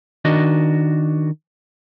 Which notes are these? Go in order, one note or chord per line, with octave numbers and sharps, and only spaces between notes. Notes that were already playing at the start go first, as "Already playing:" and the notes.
D#3 D4 F#4 D#5